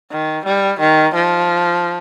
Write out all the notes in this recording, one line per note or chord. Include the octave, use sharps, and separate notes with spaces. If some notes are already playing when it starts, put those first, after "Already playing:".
D#3
G3
D#3
F3